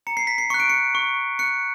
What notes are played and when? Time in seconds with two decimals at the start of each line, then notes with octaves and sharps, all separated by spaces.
0.07 A#5 C#7
0.17 C7
0.27 B6
0.38 C7
0.50 C#6 F#6 C#7
0.60 D7
0.70 C#7
0.95 C#6
1.39 F#6 C#7